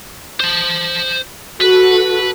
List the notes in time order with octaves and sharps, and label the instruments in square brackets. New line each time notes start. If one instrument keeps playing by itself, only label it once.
[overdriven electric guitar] C5 A5
[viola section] F#4 A4 [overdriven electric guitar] B4